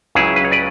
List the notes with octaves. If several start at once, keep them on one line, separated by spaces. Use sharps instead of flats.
C#2 C#3 F#3 E4 G#4
B4
C#5
B4 D5